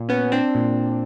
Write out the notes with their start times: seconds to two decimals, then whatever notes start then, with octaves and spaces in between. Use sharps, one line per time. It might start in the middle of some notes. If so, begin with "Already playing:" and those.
Already playing: A#2
0.09 B3 C#4
0.32 C4 D4
0.55 A#2